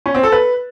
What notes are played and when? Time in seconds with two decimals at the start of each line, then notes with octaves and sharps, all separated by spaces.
0.06 C#4
0.14 C4
0.23 A4
0.32 B4